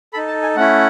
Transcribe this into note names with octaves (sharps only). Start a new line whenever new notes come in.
D#4 A4 B5
A5
G#5
A3 C#4 E4 F#5